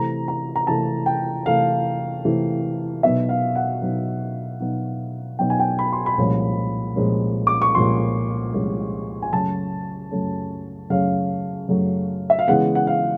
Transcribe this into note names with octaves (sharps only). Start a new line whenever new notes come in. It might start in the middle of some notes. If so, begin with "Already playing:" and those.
Already playing: C3 E3 A3 A#5
A#5
A#5
C3 E3 A3 A5
G5
C3 E3 A3 F5
C3 E3 A3
B2 F#3 B3 D#4 E5
F5
F#5
B2 F#3 B3 D#4
B2 F#3 B3 D#4
B2 F#3 B3 D#4 G5
G#5
G5
B5
C6
B5
C2 A#2 F3 G#3 C#4
C2 A#2 F3 G#3 C#4
D6
C#6
C2 A#2 F3 G#3 C#4 C6
C2 A#2 F3 G#3 C#4
G#5
F#2 C#3 F#3 A3 C#4 A5
F#2 C#3 F#3 A3 C#4
F#2 C#3 F#3 A3 C#4 F5
F#2 C#3 F#3 A3 C#4
E5
F5
C#3 E3 G#3 B3 F#5
F#5
F5